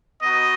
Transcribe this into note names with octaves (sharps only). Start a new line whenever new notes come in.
B3 D#4 F#4 D#5